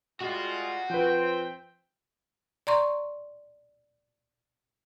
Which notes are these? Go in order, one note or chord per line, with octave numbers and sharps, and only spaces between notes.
G3 G#3 F4 F#4
F3 C4 B4 G5
D5 A#5 C6 C#6